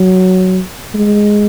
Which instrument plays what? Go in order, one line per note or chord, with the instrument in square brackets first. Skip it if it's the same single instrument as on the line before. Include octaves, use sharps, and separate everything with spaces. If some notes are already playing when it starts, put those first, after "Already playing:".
Already playing: [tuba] F#3
G#3